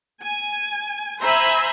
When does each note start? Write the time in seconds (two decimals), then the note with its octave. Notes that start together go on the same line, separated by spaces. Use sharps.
0.20 G#5
1.20 C5 E5 G#5 A#5 B5